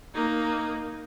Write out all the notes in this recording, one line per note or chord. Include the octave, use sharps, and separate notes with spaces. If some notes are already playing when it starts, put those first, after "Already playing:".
A#3 D#4